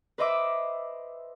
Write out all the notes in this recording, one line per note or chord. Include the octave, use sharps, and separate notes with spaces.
B4 C5 D#5 E5 D6 E6